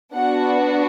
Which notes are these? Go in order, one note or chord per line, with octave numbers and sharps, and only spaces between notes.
B3 D4 F#4 F#5